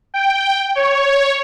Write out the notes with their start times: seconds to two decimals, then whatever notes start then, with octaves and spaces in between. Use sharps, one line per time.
0.14 G5
0.75 C#5